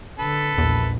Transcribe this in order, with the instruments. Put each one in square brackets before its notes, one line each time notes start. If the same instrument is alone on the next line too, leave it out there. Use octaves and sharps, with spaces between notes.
[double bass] D3 [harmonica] A4 B4
[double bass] A#1 [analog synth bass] E2